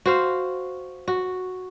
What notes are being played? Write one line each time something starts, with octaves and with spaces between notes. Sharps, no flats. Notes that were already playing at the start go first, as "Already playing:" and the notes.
F#4 C5 F5
F#4